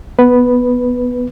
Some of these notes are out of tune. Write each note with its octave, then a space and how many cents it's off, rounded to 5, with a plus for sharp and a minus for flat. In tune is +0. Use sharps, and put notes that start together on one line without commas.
B3 +0 B4 +0